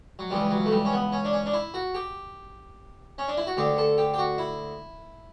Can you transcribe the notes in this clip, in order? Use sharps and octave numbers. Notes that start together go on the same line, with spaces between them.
F#3
C#2 C#3 E3 G3
F#3
A3
G3
C#4
B3
C#4
D4
C#4
D4
E4
F#4
G4
C#4
D4
E4
F#4
D2 D3 G4
A4
G4
G4
F#4
E4